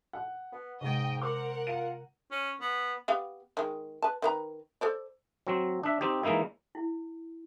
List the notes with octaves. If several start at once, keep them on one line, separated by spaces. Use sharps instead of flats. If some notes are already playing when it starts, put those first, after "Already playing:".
F#5
B3
G#2 C3 G#3 D#5 G5
A#4 C5 F#5 D6
F4 D#7
C#4
B3
B3 G4 F5
D#3 G#3
B4 A5
D#3 B4 A#5
A4 C5 D5
F#3 C4
D4 E5
C4 D#4 G4
E3 G#3 A#3 D#4 E4
E4